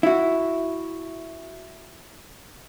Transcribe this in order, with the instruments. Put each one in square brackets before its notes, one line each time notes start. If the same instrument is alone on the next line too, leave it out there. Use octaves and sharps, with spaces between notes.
[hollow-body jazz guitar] E4 F#4